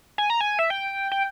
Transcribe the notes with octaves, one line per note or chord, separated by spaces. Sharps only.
G#5
A#5
G#5
E5
G5
G5